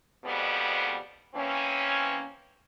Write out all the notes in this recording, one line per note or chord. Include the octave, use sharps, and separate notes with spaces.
F2 G#2 B2 F3 G3 B3
E3 A#3 C4 C#4